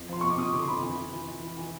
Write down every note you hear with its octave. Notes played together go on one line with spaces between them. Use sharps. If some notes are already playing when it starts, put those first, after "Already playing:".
Already playing: F2
F3 C6
F2 C#6
D6
F2 D#6
D3 D6
C6
F2 B5
E3
E3
E3
E3
E3
E3